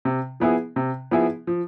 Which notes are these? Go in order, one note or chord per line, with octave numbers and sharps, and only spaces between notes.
C3
F3 B3 E4 G#4
C3
F3 B3 E4 G#4
F3